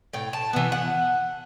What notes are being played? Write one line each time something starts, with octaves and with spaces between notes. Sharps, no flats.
A2 G5
A5
E3 B3
F#5